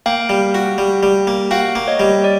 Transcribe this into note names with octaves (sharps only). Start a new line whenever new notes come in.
A#3 F5 G5
G3
F#4
G3
G3
A#3
F#4 F5 G5
A#3
C#5 D#5
G3
D5